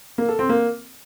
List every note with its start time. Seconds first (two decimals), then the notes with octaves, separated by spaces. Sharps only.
0.18 A#3
0.29 A4
0.39 C4
0.49 A#3